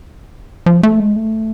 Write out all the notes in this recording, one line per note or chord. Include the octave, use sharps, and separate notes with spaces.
F3
A3
G#3
A3